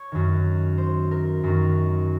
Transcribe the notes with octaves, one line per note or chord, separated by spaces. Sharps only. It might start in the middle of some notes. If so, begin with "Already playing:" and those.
Already playing: C#5
F#2 D#3
C5
A#4
F#2 D#3